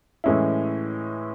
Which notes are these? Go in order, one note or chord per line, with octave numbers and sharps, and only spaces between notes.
A2 E3 G#3 C#4 E4